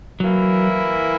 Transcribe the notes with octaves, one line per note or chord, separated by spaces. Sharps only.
E3 F#3 A#3 E4